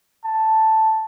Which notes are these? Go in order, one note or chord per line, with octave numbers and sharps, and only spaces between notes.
A5